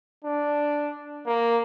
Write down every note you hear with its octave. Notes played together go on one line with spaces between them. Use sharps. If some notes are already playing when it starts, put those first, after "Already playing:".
D4
A#3